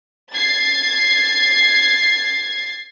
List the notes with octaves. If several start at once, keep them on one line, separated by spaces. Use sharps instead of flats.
G#6 A6 C7